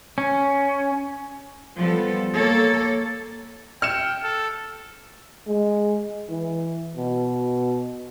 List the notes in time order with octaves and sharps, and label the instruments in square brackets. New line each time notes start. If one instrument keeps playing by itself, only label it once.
[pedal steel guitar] C#4
[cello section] F3 G3 B3 A4
A#3 A4 C#5
[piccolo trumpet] G5 [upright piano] F6 C#7 E7
[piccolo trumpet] A4
[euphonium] G#3
E3
B2